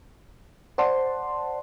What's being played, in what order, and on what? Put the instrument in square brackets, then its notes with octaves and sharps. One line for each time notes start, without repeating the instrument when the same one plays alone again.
[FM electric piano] C5 D5 F#5 A5 C6